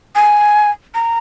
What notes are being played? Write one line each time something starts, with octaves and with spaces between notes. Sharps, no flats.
G#5
A#5